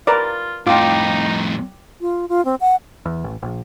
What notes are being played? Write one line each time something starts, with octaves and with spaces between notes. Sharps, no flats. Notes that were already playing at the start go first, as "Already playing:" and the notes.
F4 A#4 B4 D5
F2 A2 D#4 F4 G5 D6
F4
F4
C4
F#5
E2
A1
A#1